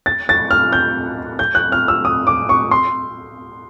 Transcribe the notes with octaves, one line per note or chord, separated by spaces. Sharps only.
A6
A6
F6
G6
G6
F#6
F6
E6
D#6
D6
C#6
C6